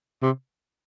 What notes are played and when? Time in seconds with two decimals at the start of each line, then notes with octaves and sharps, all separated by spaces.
0.22 C3